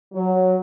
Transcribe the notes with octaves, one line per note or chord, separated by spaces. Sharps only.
F#3